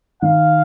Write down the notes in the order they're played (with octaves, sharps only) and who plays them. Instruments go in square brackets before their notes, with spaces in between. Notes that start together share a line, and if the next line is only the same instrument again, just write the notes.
[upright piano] D#3 [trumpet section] F5